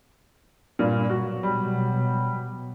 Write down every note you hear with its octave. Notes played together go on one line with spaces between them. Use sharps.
G2 A#2
B2 F#3 F#4
G3